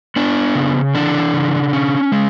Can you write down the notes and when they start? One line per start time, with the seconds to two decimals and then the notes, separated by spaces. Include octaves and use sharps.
0.16 B3 D4
0.55 C#3
0.95 E3 D4
1.34 C#3
1.73 C#4
2.12 G#3